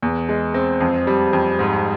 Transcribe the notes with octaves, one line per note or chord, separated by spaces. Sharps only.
E2
G#3
C4
F2
G3
F2
G#2